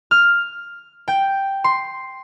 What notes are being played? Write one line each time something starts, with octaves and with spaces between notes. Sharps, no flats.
F6
G5
C6